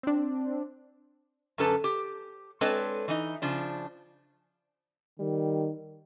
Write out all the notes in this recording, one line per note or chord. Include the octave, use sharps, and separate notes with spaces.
C4 D4
F#2 D3 C#4 A4 B4 A5
G4
G#3 C4 D4 A4 B4 C#5
E3 D#4
C#3 F3 D4
D#3 G3